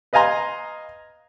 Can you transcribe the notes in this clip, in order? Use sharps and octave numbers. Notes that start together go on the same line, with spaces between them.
B4 D#5 F5 G#5 A#5 C6